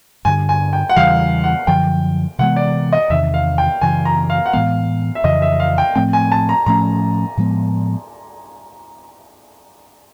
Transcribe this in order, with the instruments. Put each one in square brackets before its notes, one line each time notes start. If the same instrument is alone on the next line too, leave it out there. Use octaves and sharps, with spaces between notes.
[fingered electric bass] G2 D3 G3 [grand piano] G#5
[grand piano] G#5
G5
F#5
[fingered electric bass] E2 C#3 E3 G3 [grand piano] F5
[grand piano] F#5
[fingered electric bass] F#2 D3 F3 [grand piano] G5
[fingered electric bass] C3 E3 G#3 B3 [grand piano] F#5
[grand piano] D5
D#5
[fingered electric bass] E2 C3 D#3 [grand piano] E5
[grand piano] F5
G5
[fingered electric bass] F#2 C#3 E3 [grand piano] G#5
[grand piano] A#5
F5
F#5
[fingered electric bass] A2 E3 G#3 B3 [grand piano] F5
[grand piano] E5
[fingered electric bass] F2 C#3 E3 [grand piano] D#5
[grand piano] E5
F5
G5
[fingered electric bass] A2 F3 A3 C4 [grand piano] G5
[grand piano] G#5
A5
A#5
[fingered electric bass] A2 F3 A3 C#4 [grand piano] A#5
[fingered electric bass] A2 F3 G#3 B3